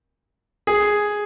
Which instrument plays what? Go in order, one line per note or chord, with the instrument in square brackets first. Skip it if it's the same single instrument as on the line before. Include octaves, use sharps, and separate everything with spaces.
[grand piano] G#4